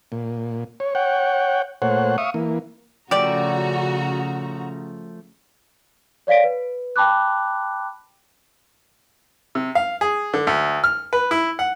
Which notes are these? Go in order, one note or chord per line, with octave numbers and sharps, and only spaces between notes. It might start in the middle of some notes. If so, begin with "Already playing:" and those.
A#2
C#5
C#5 F#5 G5
A#2 A3 C5 C#5 F#5
E5 F5 C#6 D#6
E3 A#3
C#3 F3 A3 F#4 G4 D5 A#5
C#5 D5 F5 B6 D7
B4
G5 A5 B5 D6 F#6
C3
F5
G#4
D3
D2
F6
B4
E4
F#5